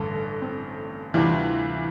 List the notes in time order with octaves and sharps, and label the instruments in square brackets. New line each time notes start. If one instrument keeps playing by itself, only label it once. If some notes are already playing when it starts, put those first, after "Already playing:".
Already playing: [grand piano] A1 G2 D3 [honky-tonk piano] A4
[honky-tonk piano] C4
[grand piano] D2 C3 G3 D4 F4 [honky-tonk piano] E3